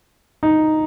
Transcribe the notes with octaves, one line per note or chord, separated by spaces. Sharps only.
D#4